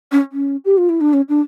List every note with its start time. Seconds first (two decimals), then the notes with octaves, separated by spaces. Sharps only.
0.12 C#4
0.32 C#4
0.65 G4
0.78 F4
0.89 E4
1.01 D4
1.13 C#4
1.29 D4